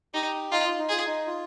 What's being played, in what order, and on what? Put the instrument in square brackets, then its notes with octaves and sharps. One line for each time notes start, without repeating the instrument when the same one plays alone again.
[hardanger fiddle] D#4 [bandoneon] G4
[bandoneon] D#4 [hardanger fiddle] F4
[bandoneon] F4
D#4
[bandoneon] F4 [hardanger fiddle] G#4
[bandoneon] D#4
F4